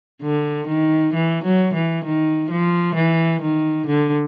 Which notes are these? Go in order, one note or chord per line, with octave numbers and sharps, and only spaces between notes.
D3
D#3
E3
F#3
E3
D#3
F3
E3
D#3
D3